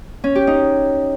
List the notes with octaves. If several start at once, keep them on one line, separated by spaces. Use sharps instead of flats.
C#4
G4
D#4